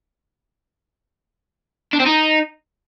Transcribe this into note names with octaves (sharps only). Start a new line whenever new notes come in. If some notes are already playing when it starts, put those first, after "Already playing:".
D4
C4
D#4